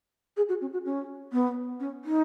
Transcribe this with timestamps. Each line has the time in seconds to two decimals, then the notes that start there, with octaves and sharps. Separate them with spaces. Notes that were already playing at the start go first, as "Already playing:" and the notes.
0.37 G#4
0.49 F#4
0.61 C#4
0.73 F#4
0.85 C#4
1.32 B3
1.80 C#4
2.05 D#4